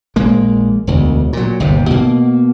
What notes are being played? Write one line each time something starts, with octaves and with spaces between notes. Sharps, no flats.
A#1 G#3 A#3
E1 D2
A#2 F#3
G1 D#2 G#2 C3
B2 A#3